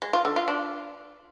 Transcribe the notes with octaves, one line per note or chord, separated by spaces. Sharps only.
G#3
F4
D3
F4
D4